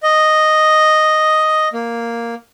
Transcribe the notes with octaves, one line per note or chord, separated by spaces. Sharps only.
D#5
A#3